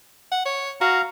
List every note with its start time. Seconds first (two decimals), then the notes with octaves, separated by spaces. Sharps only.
0.32 F#5
0.46 C#5
0.81 F#4 F5 A#5